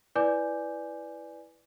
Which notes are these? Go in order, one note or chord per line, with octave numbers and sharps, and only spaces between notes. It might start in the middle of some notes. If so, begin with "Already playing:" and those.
E4 B4 D5 G#5 D6 G6